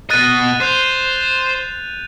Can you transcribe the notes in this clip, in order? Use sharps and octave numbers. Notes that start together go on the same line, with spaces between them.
B2 D#5 F#6 A6 D#7
C5 F#6 G6 F7